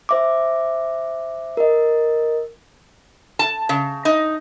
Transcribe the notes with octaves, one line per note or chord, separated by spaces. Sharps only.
C5 E5 D6
A#4 D#5
A5
C#3
D#4